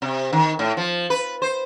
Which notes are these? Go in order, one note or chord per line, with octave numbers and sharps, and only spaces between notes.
C3
D#3
A2
F3
B4
C5